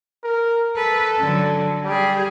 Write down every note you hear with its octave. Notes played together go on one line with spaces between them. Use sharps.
A#4
A4 B4
D3 F#3
G3 G4 G#4